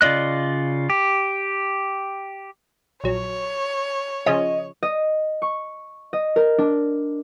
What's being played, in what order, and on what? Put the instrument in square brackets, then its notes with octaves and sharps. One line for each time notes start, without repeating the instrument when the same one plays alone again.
[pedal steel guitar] C#3 F4 D5 D#5 F#6
G4
[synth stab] A#1 F#3 [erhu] C#5
[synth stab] C#3 F3 C#4 [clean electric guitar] D#5
[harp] D#5
C#6
D#5
A#4
D4